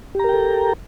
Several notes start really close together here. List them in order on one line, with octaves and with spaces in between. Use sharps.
G4 A#5 A#4 G5 A4